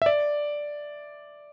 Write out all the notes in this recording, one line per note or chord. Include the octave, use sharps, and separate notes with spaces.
E5
D5